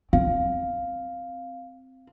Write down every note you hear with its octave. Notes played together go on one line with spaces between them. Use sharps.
C4 F5